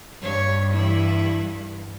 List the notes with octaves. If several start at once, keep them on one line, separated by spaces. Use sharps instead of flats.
G2 C#5
E3 E4